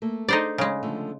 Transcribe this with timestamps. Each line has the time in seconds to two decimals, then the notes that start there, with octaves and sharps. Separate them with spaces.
0.02 A3 A#3
0.28 D4 D#4 G#4 A4 C5 D5
0.58 C#3 G#3
0.83 D3 F3 A3